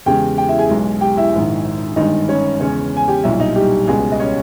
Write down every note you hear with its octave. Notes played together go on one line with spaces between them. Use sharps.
E2 C#3 G#3 G4 G5
G4 G5
E4 E5
G#4 G#5
B1 B2 G#3
G4 G5
E4 E5
A#1 G#2 D#3
G1 G2 D#3 G#3 D#4 D#5
C#4 C#5
E2 C#3 G#3 C#4 C#5
G#5
G4 G5
B1 A#2 G3 E4 E5
D#4 D#5
G3 G4
C#2 B2 G3 G#3 G#4
D#5
C#4 C#5